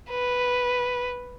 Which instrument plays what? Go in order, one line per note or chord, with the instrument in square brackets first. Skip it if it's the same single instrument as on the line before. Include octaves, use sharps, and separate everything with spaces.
[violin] B4